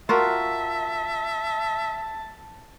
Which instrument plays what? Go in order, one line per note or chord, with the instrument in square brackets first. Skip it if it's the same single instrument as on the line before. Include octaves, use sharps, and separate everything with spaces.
[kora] F4 F#4 A#4 [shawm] E5 [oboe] A5